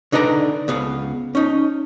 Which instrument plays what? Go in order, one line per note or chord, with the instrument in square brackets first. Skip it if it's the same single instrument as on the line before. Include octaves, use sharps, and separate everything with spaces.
[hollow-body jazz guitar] D3 D#4 B4 D5 A#5
C#2 B3 F5
C#4 D#4